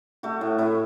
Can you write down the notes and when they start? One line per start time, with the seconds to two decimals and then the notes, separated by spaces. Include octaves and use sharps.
0.23 A3 F#4
0.41 A2
0.58 A2 E4